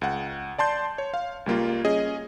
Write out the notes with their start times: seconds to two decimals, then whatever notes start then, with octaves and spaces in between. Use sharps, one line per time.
0.01 C#2 F#5
0.58 D5 A5 C6 G6
0.98 C#5
1.14 F5
1.46 C#2 G3 A#3 F4
1.85 C#4 G#4 D#5